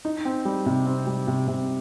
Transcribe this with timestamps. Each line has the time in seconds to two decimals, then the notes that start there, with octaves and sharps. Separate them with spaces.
0.05 D#4
0.25 C4
0.45 G3
0.66 C3
0.86 C4
1.07 G3
1.27 C3
1.48 C3